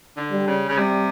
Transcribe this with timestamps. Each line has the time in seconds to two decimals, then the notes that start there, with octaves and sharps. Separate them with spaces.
0.17 D3
0.32 G3
0.47 C#3
0.69 C#3
0.77 C3 G3